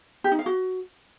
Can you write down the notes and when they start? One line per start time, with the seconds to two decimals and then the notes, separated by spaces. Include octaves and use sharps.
0.24 G4
0.32 D#4
0.39 F5
0.46 F#4